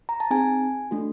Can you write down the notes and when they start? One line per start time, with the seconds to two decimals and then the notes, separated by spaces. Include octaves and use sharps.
0.09 A#5
0.20 A5
0.31 C4 D#4 G#4 G#5
0.91 A3 D4 F#4